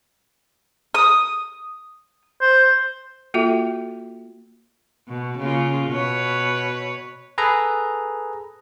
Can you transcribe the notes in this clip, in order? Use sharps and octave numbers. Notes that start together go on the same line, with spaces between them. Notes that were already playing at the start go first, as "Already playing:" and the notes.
D#6
C5
A#3 F4 F#4 A4 E5 G5
B2
C#3 A#3 F4
B2 B4 C#5
G#4 A4 B4 A#5